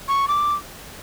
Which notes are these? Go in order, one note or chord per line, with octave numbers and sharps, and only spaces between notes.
C#6
D6